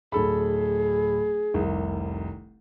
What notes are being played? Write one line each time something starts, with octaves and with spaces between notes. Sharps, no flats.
D1 G#4 A4 B5
F1 C2 D#3